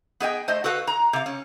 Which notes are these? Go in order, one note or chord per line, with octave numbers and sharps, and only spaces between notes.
B3 G#4 D#5 G5
A3 C5 D#5
F#4 A4 B4 F5
A#5
C3 F5
C#4